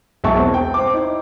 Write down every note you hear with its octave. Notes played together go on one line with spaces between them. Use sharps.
E1 B1 E2 E5 A5 C#6
B3 C4
G5
C5 D6
D#4 E4